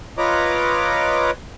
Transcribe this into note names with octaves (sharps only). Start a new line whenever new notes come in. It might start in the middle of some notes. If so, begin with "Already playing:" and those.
F4 B4 C#5 D#5 A#5 D6